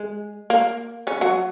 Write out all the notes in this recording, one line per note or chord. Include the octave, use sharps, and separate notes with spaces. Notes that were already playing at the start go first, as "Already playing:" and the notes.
Already playing: G#3
A#3
C#3 C#4
F#3 F#4